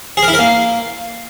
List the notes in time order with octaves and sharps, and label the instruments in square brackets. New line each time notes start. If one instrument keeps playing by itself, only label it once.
[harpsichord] G#4
A#4
E4
A#4
A#3